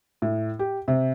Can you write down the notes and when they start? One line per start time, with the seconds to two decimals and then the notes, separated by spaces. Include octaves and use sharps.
0.22 A2
0.59 G4
0.88 C3